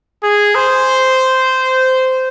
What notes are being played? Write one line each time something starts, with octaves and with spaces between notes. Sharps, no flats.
G#4
C5